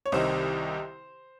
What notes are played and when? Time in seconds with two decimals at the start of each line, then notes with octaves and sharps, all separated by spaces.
0.06 C#5
0.12 C2 C3 D#3 C5